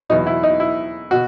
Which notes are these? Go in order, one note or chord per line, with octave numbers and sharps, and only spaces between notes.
E2 B2 F#3 B3 D#4
E4
D#4
E4
B2 F#4